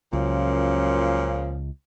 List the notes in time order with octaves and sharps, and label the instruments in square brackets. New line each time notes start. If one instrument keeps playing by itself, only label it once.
[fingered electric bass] C#2 [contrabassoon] F#2 [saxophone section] A#2 C#3 F3